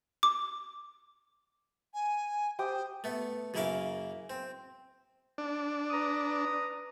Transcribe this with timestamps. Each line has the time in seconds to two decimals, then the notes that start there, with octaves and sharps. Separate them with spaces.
0.23 D6
1.94 G#5
2.59 G4 C5 G5 D#6
3.04 A3 B3
3.54 F#2 C#3 A#3 E4 A#4 F5
4.30 C4
5.38 D4
5.90 B4 A#5 D#6